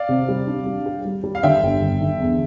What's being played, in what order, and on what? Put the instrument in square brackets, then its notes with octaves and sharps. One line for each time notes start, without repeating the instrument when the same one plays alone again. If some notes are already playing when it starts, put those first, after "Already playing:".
Already playing: [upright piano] D5 F5
[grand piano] C3
G3
D4
G3
G4
G3
G3
[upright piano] F5
[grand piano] D3 [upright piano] E5 G5
[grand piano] G1
G1
D3
E2